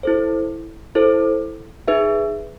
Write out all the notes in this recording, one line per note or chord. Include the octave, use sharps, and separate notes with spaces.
E4 A4 C5
E4 A4 C5
D#4 G#4 B4 E5